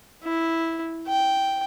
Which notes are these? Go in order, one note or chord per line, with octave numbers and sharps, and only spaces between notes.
E4
G5